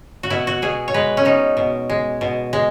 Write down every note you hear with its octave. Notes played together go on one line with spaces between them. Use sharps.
F#4
B2 E4
F#4
B2 G#4
C#5
G#3 B4
C#4
B2 D#4
B2
G#3
B2
G#3